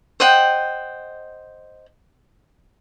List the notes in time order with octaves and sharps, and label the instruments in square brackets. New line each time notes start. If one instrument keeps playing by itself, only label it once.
[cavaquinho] C5 D#5 F#5 G5